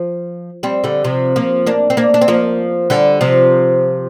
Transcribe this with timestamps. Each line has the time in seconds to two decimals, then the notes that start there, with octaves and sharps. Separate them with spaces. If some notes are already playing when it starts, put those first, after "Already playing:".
Already playing: F3
0.63 G3 C4
0.84 D3 G3
1.04 C3 F3
1.36 F3 A#3
1.67 A#3 D4
1.90 C4
1.97 A#3 D4
2.14 D4
2.21 C4
2.28 F3 A#3
2.90 D3 G3
3.21 C3 F3